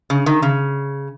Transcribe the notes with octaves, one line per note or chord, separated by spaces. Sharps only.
C#3
D#3
C#3